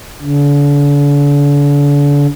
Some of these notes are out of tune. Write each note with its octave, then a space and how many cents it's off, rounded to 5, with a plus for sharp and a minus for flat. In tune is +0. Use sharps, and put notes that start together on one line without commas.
D3 -40